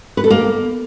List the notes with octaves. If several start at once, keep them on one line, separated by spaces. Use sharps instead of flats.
B4
A4
A#3